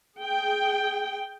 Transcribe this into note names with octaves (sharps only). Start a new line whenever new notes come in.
G#4 G5